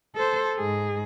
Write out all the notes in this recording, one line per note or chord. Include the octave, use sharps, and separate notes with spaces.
A4 C5
G#2 G#4